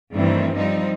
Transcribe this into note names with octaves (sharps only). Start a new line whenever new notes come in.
G2 D#3 E3 A3 C4
F3 G3 C4 D#4